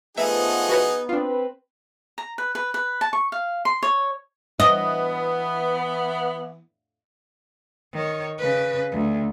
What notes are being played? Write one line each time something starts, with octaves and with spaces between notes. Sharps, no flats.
F3 A3 B3 D#4 G#4 E5 F#5
F#4 B4 C#5
C4 D4 F4 B4
A#5
B4
B4
B4
A5
C#6
F5
C6
C#5
E3 B3 D#5
D#3 C#5
C#3 B4
D2